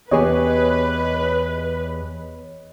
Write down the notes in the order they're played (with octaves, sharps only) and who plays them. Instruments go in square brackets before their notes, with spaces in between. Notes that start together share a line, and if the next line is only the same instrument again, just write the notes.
[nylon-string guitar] E2 G#5 [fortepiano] B3 G4 G#4 [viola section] B4 [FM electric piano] C#5 D#5